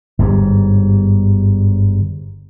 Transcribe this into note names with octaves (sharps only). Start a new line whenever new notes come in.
G1 G#2 C3 G3